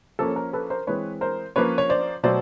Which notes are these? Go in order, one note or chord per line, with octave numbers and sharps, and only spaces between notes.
F3 A#3 C#4 A4
A#4
A4 B4
A#4 C5
E3 G#3 C4 B4 C#5
A#4 C5
F3 A#3 C#4 B4 C#5
C#5
C5 D5
B2 F#3 A3 C5 D5